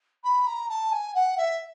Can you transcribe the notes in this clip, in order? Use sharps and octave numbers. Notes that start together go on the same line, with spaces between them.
B5
A#5
A5
G#5
F#5
E5